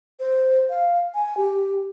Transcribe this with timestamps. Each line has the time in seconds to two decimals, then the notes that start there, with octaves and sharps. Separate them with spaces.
0.20 C5
0.70 F5
1.15 G#5
1.37 G4